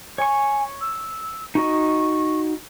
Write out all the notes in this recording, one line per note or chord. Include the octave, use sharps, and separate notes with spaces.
C#5 G#5 C#6
E6
D#4 F#4 D#5 C#6